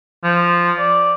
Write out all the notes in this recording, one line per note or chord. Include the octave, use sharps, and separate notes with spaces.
F3
D5